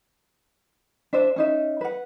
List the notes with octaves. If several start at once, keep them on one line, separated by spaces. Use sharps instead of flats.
D4 C5 E5
C#4 D#4 E5
B4 F#5